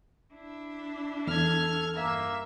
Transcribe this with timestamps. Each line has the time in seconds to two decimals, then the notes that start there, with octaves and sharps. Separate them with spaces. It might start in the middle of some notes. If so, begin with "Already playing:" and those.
0.34 D4 E4
1.27 E2 A4 F6 G#6
1.96 G2 A#3 E5